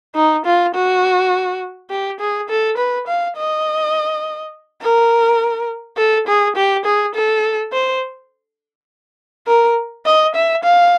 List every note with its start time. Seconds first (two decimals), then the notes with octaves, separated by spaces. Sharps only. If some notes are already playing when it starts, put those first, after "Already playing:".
0.15 D#4
0.46 F4
0.75 F#4
1.90 G4
2.20 G#4
2.49 A4
2.78 B4
3.07 F5
3.37 D#5
4.82 A#4
5.97 A4
6.27 G#4
6.56 G4
6.85 G#4
7.15 A4
7.73 C5
9.47 A#4
10.06 D#5
10.35 E5
10.64 F5